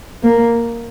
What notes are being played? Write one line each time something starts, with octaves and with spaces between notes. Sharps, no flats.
A#3